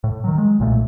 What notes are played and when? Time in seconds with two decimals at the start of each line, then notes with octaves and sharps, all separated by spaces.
0.04 A2
0.24 D#3 F#3
0.38 G#3
0.60 B1 A#2 A3